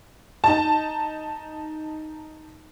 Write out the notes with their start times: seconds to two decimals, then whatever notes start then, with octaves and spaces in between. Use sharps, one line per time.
0.44 D#4 A5